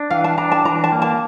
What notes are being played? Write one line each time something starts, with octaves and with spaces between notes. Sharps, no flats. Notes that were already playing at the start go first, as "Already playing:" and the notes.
Already playing: D4
E3 F5
A5
D4 A#5
A5
E3 A#5
A5
A#3
A5